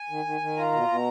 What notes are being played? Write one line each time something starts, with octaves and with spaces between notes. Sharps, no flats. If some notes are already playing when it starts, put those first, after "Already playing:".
Already playing: G#5
D#3
D#3
D#3
F4 A#5
B2
B2